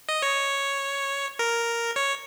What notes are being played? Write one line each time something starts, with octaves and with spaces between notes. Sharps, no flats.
D#5
C#5
A#4
C#5